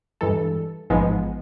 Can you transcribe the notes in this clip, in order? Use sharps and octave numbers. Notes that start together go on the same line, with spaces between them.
G2 E3 G#3 A4
A1 G#2 F3 G#3 B3